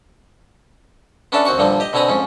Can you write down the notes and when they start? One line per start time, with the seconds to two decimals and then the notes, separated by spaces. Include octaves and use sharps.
1.32 B3 C#4 D4 A4 D5 E5
1.45 D#2 C4 F#4 C#6
1.58 G2 A#2 D3 F3 A#3
1.80 G4 D#5
1.93 B2 D3 C4 G#5 A#5 B5
2.09 F2 G#2 C#4